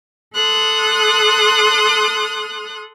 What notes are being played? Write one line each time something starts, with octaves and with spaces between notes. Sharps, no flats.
A4 C6 D#6 F#6